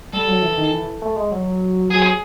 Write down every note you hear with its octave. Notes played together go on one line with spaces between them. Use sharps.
G3 A4
F#3
E3
D#3
E3
A3
G#3
F#3
F#3 G#4